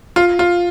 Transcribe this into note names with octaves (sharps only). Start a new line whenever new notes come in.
F4
F4